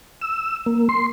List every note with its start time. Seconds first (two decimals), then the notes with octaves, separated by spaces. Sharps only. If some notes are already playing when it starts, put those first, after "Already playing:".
0.22 E6
0.66 A#3
0.89 C6